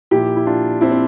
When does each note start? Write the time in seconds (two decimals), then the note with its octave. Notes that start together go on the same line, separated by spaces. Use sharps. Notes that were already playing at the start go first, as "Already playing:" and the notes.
0.11 A#2 F3 E4 G4
0.36 E4
0.46 D4 F4
0.81 C4 E4
0.91 C4